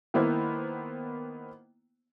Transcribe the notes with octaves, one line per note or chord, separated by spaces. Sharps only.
D#3 A#3 B3 E4 C5